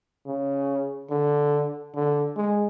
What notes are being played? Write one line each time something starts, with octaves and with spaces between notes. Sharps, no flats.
C#3
D3
D3
G#3